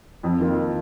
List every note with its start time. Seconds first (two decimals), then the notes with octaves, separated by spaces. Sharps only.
0.23 F2
0.39 D#3 A#3 F4